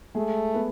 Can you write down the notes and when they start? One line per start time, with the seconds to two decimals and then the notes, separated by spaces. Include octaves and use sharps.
0.15 G#3 A3 G#4
0.54 B3 B4